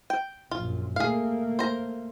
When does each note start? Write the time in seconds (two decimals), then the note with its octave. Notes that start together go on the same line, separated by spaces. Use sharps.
0.10 G5
0.51 A#1 F#2 F4
0.96 A3 A#3 G#4 F5
1.59 C5 A#5